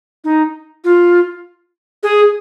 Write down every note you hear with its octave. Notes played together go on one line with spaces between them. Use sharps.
D#4
F4
G#4